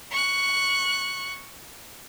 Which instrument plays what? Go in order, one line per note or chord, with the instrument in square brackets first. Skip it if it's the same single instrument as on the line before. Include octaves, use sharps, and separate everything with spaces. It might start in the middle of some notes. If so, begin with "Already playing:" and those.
[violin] C#6 F#6